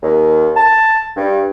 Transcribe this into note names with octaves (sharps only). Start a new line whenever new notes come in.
D#2
A5
G2